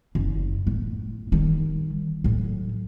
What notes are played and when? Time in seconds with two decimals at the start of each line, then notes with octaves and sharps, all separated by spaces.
0.15 F#1
0.67 A2
1.32 D#3 G3
2.24 A2 F#3